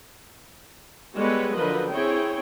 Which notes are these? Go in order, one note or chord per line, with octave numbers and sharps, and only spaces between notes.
G3 G#3 B3 A4 B4 C#5
D3 F3 F#3 A#4 B4 D#5
C4 E4 G#4 C#5 G5